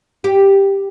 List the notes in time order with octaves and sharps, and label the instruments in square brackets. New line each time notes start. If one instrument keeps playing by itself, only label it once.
[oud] G4